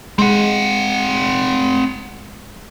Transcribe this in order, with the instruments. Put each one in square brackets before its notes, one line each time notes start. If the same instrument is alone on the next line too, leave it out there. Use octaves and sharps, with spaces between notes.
[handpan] G#3 [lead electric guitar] C4 F#5